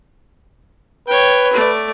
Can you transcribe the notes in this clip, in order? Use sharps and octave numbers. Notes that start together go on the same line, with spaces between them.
B4 C#5 G5
A3 D5